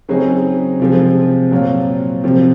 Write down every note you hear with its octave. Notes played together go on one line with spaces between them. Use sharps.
C#3 F#3 C4 D#4 G#4
C3 F3 G#3 C4
A#2 F#3 C4 F4
C3 F3 C4